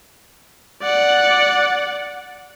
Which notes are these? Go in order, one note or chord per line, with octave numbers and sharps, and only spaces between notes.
D5 F#5